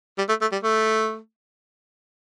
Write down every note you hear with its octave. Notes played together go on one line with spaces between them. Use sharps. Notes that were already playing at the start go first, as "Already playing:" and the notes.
G3
A3
A3
G3
A3